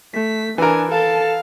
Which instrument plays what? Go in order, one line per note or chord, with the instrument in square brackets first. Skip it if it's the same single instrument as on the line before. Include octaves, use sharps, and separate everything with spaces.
[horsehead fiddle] A3 [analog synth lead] B6
[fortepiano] E3 A#4 [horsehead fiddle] D4 [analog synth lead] G#5
[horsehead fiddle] A4 A5 [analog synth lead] F5